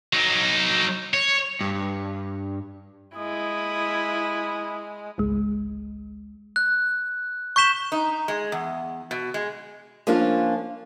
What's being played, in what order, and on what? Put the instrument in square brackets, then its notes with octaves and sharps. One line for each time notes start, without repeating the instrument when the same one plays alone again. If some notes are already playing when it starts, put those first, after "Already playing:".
[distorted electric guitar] F#3 D#4
C#5
[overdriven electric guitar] G2
[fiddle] G#3 [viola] E4 [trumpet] D#6
[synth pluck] G#1 C#2 G#3
[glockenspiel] F#6
C#6 G6 B6 E7 G7
[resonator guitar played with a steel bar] D#4
G#3
E2
B2
G#3
[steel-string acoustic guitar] F3 A#3 C#4 D4 F4